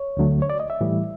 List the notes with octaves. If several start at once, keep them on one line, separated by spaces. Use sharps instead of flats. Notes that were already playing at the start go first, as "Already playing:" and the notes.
Already playing: C#5
D2 D3 F#3 A3
C#5
D5
D#5
E5
A2 E3 G3